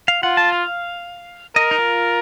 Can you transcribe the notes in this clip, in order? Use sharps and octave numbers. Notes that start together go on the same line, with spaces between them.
F5
F4 F#5
A5
F5
A#4 D#5
D#4
F4